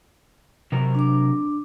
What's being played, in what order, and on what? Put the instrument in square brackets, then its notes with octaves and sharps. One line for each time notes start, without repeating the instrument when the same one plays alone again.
[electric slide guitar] C3 F#3 A#4
[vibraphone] D4 D6